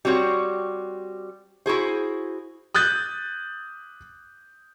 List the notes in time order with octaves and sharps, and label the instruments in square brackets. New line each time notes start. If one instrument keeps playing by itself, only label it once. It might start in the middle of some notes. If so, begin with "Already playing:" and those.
[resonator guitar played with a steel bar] G3 C4 F#4 C#5
E4 F#4 G#4 C5
[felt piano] D#6 F#6 G6 A6